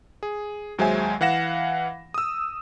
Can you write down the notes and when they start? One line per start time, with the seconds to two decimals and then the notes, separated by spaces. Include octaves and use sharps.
0.23 G#4
0.78 D#2 F#3 G#3 C5 E5 G#5
1.21 E3 F5 F#5 A#6 E7
2.14 D#6 E6